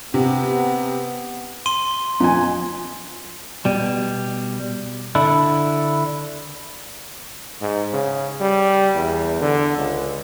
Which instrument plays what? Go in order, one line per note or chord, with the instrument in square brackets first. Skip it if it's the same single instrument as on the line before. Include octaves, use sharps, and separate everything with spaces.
[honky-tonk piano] C3 [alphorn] B3
[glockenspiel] C6 D#7 G7
[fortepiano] F2 G#5
[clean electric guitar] B2 G3
D3 D4 E4
[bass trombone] G#2
C#3
G3
E2
D3
C#2